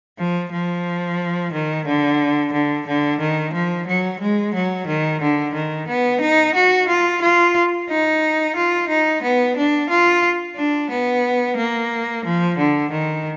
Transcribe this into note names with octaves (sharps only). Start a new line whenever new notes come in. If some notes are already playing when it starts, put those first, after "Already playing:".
F3
F3
D#3
D3
D3
D3
D#3
F3
F#3
G#3
F#3
D#3
D3
D#3
B3
D#4
F#4
F4
F4
D#4
F4
D#4
B3
D4
F4
D4
B3
A#3
F3
D3
D#3